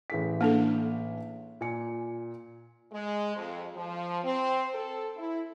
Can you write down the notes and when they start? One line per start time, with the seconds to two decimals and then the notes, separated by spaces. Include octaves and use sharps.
0.10 A1 G#4 B6
0.41 A#3 D4 A4
1.61 A#2 G#5 C#7
2.92 G#3
3.36 F2
3.76 F3
4.24 C4
4.74 A4
5.16 E4